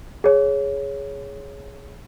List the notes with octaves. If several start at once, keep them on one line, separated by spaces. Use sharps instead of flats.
G#4 C#5